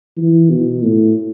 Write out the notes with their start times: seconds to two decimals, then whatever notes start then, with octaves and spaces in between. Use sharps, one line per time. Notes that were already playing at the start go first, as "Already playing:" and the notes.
0.17 E3
0.50 B2
0.83 A2